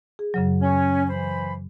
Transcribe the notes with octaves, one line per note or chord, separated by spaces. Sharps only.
G#4
F#2 C#3 F#3
C#4
E3 C5 B5